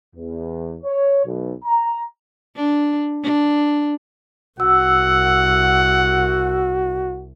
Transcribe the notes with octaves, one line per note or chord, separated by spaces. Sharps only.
E2
C#5
B1
A#5
D4
D4
C2 F#4 F#5 E6